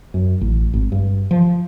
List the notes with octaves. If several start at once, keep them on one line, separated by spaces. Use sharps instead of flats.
F#2
A1
G#1
G2
F3